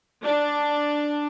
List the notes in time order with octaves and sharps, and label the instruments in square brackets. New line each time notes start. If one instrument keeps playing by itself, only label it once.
[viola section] D4